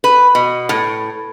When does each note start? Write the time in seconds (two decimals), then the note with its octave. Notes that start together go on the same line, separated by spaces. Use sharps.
0.04 B4
0.35 B2
0.69 A2